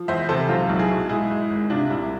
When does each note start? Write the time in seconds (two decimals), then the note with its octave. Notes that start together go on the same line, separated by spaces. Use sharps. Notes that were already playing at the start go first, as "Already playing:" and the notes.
Already playing: F3
0.08 E2 C5 E5
0.29 C3 A4 C5
0.49 B1 F4 A4
0.69 B1
0.79 E4 G#4
0.90 B2
1.09 G#2 E4 G#4
1.30 G#2
1.50 G#1
1.70 C3 D4 F4
1.90 C2 E4